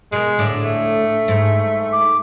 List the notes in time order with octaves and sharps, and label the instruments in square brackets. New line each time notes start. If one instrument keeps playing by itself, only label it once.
[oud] B2 A#4 [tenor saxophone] G#3
[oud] D2 A2 D5
[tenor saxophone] A3
[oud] G#2
[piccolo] D6